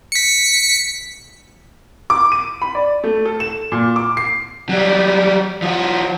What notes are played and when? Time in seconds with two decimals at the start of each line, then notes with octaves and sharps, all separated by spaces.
0.12 B6 C#7
2.10 D6
2.32 D#7
2.62 B5
2.75 D5
3.04 A3
3.25 A4
3.40 E7
3.72 A#2
3.96 D6
4.17 C7
4.69 F#3 G3
5.62 F3 F#4